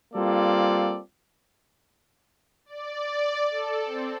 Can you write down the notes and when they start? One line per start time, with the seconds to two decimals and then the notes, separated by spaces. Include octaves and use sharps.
0.14 G3 A#3 C4 F4 A4 D5
2.66 D5
3.50 A4
3.85 C4